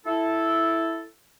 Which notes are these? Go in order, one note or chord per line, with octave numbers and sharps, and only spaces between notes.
E4 A4